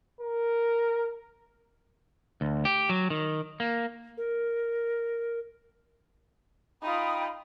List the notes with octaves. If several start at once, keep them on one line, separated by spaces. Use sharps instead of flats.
A#4
D2
G4
F#3
D#3
A#3
A#4
D#4 F4 G5 B5 D#6